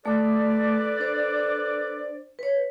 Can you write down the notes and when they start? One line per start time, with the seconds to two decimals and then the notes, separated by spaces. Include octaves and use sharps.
0.05 A3 A4 B4 D5 D6
1.00 D4 C5
2.39 B4 C#5